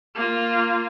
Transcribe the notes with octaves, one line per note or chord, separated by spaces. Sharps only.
A#3 F4